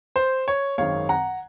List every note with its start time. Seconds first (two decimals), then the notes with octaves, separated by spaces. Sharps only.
0.16 C5
0.48 C#5
0.78 G#1 F#2 D#3 G#3 C4 C#5 F5
1.09 F#5 A#5